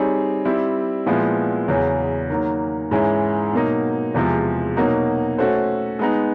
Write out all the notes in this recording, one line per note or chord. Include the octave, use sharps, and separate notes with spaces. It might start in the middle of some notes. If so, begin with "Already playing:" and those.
Already playing: G3 C4 D#4 G#4 C#5
G3 C4 E4
A#2 F3 G#3 B3 E4
E2 C#3 F#3
D#3 F#3 A#3
G#2 E3 G#3 C#4 E4
B2 F#3 A#3 D#4
E2 C3 F3 G#3
B2 F#3 A#3 D#4 F#4
A3 C#4 F#4 A4 C5
G#3 B3 D#4